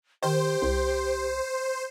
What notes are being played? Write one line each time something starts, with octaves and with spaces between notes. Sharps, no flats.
D#3 G4 C5
C2